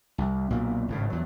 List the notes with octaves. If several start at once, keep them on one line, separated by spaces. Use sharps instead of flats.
C2
B1 A#2 A#3
G#1 A2 C#3
E2 F#3